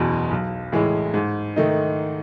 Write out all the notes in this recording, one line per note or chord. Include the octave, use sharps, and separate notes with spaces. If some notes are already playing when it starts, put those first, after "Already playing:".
Already playing: F#1 E2 B2
B1
A2 E3 G#3
G#2
D#3 A3 D#4